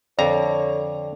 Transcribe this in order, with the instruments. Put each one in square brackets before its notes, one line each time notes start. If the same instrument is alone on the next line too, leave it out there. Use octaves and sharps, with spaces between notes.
[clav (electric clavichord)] F2 A#5 [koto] D3 [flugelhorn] C#5 [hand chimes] D5